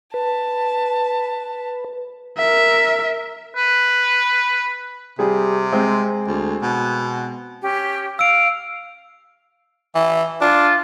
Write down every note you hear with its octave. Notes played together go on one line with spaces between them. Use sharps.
B4 A5
A#4 E5
B4
C3 G3 G#4
G#3 C4
D2
B2
C#4 G4
F5 E6 D7
E3
D4 F4